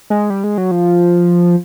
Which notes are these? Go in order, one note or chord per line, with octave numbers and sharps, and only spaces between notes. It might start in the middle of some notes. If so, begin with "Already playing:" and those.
G#3
G3
G#3
F#3
F3